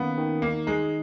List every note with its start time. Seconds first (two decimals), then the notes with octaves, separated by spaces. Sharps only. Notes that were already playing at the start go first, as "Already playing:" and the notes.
Already playing: D#3 A#3 B3 C#4
0.17 D#3
0.42 A#3 D#4
0.67 G#3 D#4